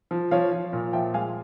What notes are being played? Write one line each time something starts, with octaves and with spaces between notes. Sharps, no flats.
F3
F3 C#5 F5
F3
A#2
F3 E5 G5
G#3 F5 G#5